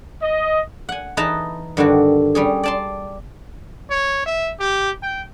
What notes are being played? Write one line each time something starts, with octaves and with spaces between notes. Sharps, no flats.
D#5
F#5 G#5
E3 D#4 G#4 B4 A5 A#5
G2 D3 D#3 F#4
G3 C#4 G#4
D5 A5 C6
C#5
E5
G4
G5